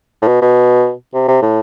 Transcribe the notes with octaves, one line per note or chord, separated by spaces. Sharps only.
A2
B2
B2
C3
C3
A2